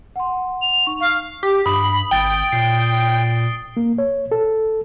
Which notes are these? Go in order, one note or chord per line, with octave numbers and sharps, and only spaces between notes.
F#5 C6
F7
D#4 C#6
F5 C#6 F6
G4
G2 B5 D#6
G#1 G5 A6 D7 G7
A#2 C7
A#3
C#5
A4